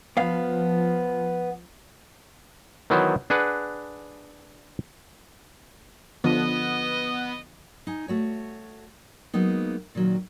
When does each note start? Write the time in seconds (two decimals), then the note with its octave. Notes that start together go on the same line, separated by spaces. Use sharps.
0.17 F3 B3 F5
2.90 D#3 E3 F#3 B3 E4 C5
3.30 D4 G#4 B4 F#5
6.24 D3 F3 B3 D#5
7.87 D#4 G#5
8.08 A3 F#4 C#5
9.34 F#3 G#3 A#3 B3 D#4
9.95 A#2 D#3 F#3